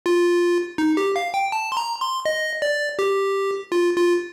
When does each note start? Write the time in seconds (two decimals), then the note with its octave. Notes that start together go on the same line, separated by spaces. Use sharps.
0.06 F4
0.78 D#4
0.97 G4
1.16 F5
1.34 G5
1.52 A5
1.72 C6
1.77 A#5
2.01 C6
2.26 D#5
2.62 D5
2.99 G4
3.72 F4
3.96 F4